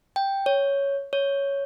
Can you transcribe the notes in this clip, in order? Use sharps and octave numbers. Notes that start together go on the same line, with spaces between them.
G5
C#5
C#5